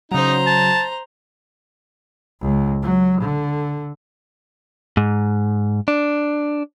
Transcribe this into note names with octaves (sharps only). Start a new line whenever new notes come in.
C#3 F#3 D#4 C5 A#5
A5
C#2
F#3
D3
G#2
D4